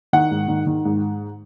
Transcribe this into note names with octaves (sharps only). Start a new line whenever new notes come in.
D#3 F#5
G#2
D#3
D#3
G#2